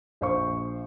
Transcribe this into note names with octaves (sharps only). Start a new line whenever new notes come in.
A#1 C5 C#6